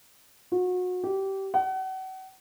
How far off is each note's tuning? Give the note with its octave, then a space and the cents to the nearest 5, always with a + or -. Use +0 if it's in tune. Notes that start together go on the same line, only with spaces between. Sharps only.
F#4 -30
G4 -20
F#5 +35